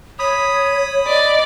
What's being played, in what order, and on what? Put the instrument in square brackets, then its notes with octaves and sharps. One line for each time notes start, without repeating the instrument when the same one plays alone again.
[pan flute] C#5 [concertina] B5 D#6
[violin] D5 [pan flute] D#5